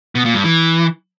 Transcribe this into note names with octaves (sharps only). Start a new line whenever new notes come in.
B2
A#2
G2
E3